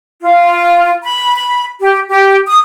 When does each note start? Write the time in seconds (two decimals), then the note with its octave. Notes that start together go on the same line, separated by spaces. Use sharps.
0.23 F4
1.04 B5
1.36 B5
1.80 G4
2.08 G4
2.47 D#6